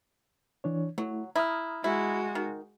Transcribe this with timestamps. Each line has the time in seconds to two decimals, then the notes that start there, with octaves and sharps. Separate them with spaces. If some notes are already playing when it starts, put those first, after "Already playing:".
0.64 E3 D4 C#5
0.98 F#3 A3 E4
1.35 E4 A#5 D#6 F6
1.84 G#3 E4 F#4
2.35 D#3